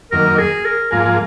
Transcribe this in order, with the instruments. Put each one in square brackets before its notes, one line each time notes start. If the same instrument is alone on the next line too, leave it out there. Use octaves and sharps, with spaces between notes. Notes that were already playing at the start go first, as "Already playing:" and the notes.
[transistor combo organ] F#2 D#3 A#3 [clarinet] A#4
[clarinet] G#4
A#4
[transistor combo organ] G#2 F3 A#3 F4 G#4 [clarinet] A#4